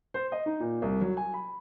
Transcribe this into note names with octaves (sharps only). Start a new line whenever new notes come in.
C5
D#5
D#4
A#2
C2
F#3
G#5
B5